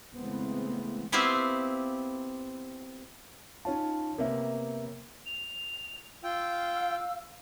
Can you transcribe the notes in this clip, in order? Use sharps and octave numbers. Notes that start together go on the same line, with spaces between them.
C#3 E3 G#3 A3 B3 C4
B3 C4 E4 F4 G4 C5
C#4 D#4 F4 C#5 A5
C3 A#3 B3 A#4 C#5 E5
F7
F4 F5 G5 E6